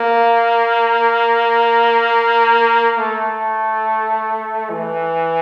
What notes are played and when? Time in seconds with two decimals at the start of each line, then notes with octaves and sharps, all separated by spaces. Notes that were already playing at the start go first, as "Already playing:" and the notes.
Already playing: A#3
2.98 A3
4.70 E3